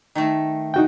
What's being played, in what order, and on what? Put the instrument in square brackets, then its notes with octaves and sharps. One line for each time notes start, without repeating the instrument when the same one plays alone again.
[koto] D#3 A3
[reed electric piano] D#4 F#4 G5